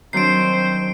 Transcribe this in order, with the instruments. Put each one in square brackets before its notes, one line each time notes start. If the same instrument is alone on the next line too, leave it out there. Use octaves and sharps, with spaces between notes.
[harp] D#3 F#3 D4 [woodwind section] C4 C5 [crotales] C7 D7